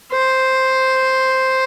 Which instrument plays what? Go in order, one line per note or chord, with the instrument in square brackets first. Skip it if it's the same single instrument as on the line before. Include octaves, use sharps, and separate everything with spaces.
[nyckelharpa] C5